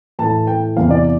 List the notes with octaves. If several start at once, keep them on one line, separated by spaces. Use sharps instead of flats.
A2 E3 A5
G5
E2 C3 E3 F5
D5